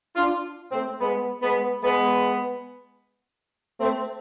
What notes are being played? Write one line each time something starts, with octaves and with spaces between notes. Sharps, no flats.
D4 F4
A3 C4
G#3 B3
G#3 B3
G#3 B3
A3 C4